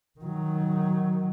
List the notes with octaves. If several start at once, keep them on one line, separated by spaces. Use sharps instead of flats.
D#3 F#3